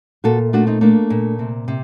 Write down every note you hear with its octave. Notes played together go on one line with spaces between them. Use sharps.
A#2 F#4 A4
A3 D4 F#4
C4 D#4
A3 A#3 D4
A#2
C3
C3